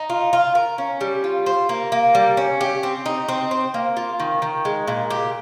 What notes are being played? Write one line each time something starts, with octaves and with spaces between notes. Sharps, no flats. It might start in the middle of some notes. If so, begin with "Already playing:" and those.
Already playing: D#4
F4
F4
A#4
C#4
G3
F4
C5
A#3
A#3
G3
C#4
G4
C4
D#4
C4
C5
A#3
F4
D#3
D#3
G#3
A#2
G4